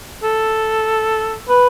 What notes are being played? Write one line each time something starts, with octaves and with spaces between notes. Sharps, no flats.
A4
B4